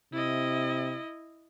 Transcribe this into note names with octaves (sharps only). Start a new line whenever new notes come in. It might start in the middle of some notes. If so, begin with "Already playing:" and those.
C3 E4 D#5